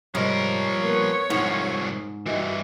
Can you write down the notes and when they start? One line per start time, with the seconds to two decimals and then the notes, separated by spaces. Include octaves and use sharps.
0.15 G#2 C3 F3 G3 A#4 C#5
0.83 A#3 B3
1.30 C2 G#2 F3 F#5
2.26 G2 E3 F#4 D#5